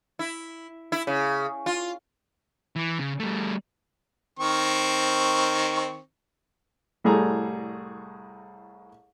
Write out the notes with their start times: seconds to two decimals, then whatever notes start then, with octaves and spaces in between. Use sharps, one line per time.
0.19 E4
0.92 E4
1.07 C#3
1.66 F4
2.76 E3
2.99 C#3
3.20 G3 A3
4.39 D#3 C4 C#6
7.04 C2 A2 G3 G#4 A4 A#5